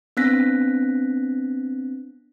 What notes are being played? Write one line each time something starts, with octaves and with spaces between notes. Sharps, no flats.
B3 C4 D4 F#6 A#6 B6